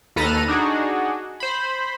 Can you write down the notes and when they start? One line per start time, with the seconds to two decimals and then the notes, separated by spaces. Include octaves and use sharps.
0.16 D#2 A4 B4 A#5 F6 D#7
0.48 D4 D#4 F#4 G#4
1.40 C5 B5